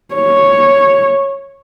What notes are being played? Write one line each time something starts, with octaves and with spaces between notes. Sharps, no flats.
C#5